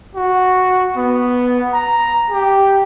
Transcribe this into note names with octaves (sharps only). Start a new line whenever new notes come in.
F#4
B3
A#5
G4